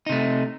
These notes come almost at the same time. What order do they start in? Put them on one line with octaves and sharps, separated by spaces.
D#4 C3 A3